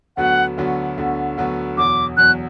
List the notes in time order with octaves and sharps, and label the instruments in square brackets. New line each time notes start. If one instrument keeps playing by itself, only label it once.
[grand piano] D2 D3 F#3 B3 F#4 [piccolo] F#5
[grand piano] D2 D3 F#3 B3 F#4
D2 D3 F#3 B3 F#4
D2 D3 F#3 B3 F#4
[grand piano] E2 B2 F#3 [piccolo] D6
[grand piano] E2 B2 F#3 [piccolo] F#6